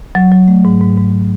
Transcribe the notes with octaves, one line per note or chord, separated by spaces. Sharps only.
F#3
F#3
A3
G#2
G#2
G#2